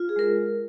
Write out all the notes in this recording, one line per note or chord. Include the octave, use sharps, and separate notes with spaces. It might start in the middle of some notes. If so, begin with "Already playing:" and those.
Already playing: F4
G#4
G#3 A#4